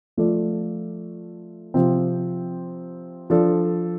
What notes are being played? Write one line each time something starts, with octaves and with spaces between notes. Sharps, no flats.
F3 A3 F4 A4 D5
C3 F3 C4
F3 D4 A4